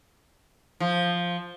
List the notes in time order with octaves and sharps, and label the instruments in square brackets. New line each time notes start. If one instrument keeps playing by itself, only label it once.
[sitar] F3